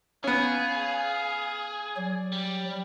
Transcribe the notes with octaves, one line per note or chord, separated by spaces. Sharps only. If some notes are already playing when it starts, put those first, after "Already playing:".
B3 C#4 G#4 F5
F#3 D5
G3